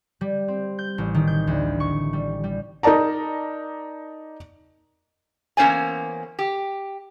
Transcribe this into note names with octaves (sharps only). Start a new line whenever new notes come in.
G3
C4
G6
A1
D#3
G6
D2
C#6
G3
G3
D#4 A#4 D5 A5 A#5
E2 A#3 C#4 C5 D5 G#5
G4